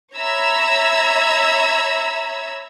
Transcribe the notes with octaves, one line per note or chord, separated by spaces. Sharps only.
C#5 E5 A#5 B5 E6 G#6